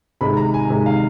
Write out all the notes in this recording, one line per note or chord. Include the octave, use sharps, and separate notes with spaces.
C3 D#3 G#3 B5
A#5
G#5
C3 D#3 G#3
F5